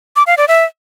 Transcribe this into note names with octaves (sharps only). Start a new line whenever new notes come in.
D6
F5
D5
E5